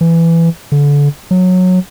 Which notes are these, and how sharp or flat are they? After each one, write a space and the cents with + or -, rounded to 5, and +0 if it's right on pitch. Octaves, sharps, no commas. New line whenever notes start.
E3 +15
D3 -30
F#3 -15